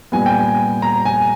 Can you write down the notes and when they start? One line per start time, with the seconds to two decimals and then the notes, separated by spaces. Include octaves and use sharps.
0.12 A#2 G3 B3 G#5
0.26 G5
0.39 G#5
0.82 A#5
1.05 G#5